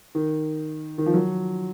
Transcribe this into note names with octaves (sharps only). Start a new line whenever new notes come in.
D#3
D#3
F3
F#3